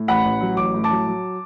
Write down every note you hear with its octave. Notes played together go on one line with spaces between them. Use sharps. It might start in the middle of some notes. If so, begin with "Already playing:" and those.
Already playing: A2
A1 F#5 B5
A1
F#3
A1 D6
A2
A5 D6
F#3
F#3